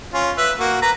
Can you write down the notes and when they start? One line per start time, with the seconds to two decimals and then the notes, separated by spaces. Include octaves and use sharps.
0.14 C#4 F4
0.38 B4 E5
0.60 A#3 F#4
0.82 B4 A#5